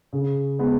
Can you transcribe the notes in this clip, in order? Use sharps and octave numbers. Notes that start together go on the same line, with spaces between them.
C#3
G#3 B3